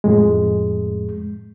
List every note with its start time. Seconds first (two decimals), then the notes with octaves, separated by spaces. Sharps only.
0.04 F2 A2 G#3